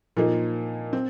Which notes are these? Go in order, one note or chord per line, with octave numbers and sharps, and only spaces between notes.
A#2 F3 A#3 D#4
C4